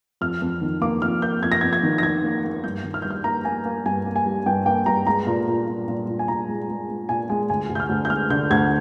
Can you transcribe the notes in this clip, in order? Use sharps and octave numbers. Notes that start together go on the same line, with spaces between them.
F2 F6
F2
D#3
A#3 D6
F2 F6
A#3 G6
F2 G#6
A#6
F2 G#6
G#6
D#3
A#6
D#3 G#6
A#3
A#3
G2 G6
D#3
F6
G3 G6
F6
A#3 A#5
A#3 G#5
A#3
G2 G#5
A#3
G#5
G3
G2 G5
A#3 G5
G2 A#5
G#3 A#5
A#2
A#2
A#2
A#2
A#2
G#5
A#2 A#5
G#3
G#3
G#3
A#2 G#5
G#3 G#5
D2 G#5
D2
G6
F6
D2
G6
G#3 F6
D3 G6
D2 G#6